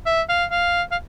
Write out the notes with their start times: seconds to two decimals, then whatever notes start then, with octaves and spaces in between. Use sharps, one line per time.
0.06 E5
0.29 F5
0.51 F5
0.92 F5